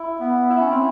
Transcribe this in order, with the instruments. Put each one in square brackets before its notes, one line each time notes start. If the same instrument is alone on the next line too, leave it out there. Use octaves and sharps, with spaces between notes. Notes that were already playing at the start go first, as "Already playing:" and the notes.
Already playing: [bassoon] E4
[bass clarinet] B3
[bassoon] E4
[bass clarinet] C#4
C4